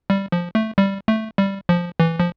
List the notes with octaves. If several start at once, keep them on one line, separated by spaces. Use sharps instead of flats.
G3
F3
A3
G3
A3
G3
F3
E3
F3